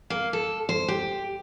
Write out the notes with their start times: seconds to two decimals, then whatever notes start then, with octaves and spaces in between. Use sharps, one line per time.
0.10 A#3
0.33 A4
0.69 C5
0.88 G4